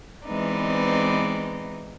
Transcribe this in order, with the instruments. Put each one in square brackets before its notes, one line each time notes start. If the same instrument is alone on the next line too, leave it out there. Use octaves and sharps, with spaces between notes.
[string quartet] E3 G#3 B3 C4 D#4 D5